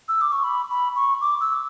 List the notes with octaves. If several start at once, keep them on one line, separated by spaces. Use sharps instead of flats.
E6
D6
C#6
B5
B5
C#6
D6
E6